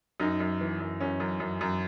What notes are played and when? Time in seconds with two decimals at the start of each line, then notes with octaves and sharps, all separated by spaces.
0.20 F#2 D#4
0.40 F#2
0.61 E3
0.80 F#2
1.00 F#2 C#4
1.20 F#2
1.40 F#2
1.61 F#2